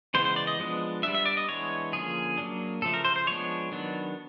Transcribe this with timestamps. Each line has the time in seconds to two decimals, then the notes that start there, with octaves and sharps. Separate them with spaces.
0.14 C#3 E3 G#3 B3 C5
0.25 C5
0.36 D5
0.47 D#5
0.59 F3 G#3 B3 D4
1.03 G3 B3 D4 E5
1.15 E5
1.26 D5
1.37 D#5
1.48 E3 G#3 B3 D4 C#5
1.93 D3 F3 A#3 C#4 G#4
2.38 F#3 A#3 D4
2.82 C#3 F3 A3 A4
2.94 A#4
3.05 C5
3.16 C5
3.27 F3 G#3 B3 D4 C#5
3.72 D#3 F#3 B3 D4